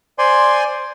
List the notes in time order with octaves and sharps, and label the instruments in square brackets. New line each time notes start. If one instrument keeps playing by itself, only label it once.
[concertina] C5 D5 G#5 C6